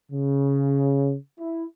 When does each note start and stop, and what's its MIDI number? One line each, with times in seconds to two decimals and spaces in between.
0.11 1.16 49
1.40 1.64 64